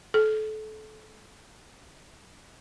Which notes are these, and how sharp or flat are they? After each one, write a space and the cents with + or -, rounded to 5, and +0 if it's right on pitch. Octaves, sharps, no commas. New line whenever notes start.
A4 -30